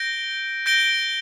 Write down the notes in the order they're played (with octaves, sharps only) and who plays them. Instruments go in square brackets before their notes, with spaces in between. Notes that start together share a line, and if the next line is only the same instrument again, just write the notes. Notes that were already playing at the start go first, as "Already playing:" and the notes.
Already playing: [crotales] G6 A#6 D7 G7
G6 A#6 D7 G7